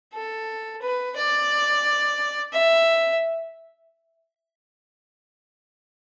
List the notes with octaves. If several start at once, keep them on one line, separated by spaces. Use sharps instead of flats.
A4
B4
D5
E5